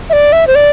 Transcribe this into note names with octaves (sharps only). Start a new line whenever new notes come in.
E5
D5
E5
C5
D5